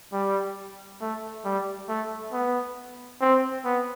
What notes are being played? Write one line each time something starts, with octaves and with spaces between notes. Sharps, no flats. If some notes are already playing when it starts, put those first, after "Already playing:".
G3
A3
G3
A3
B3
C4
B3